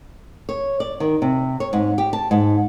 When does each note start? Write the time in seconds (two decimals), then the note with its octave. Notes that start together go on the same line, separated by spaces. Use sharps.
0.49 C#5
0.80 D5
1.00 D#3
1.22 C3
1.60 C#5
1.73 G#2
1.98 G4
2.13 A5
2.31 G#2